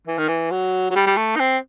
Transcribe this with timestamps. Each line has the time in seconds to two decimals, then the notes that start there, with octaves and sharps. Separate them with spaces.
0.07 E3
0.18 D#3
0.28 E3
0.51 F#3
0.91 F#3
0.95 G3
1.07 G3
1.17 A3
1.36 D#4
1.39 C4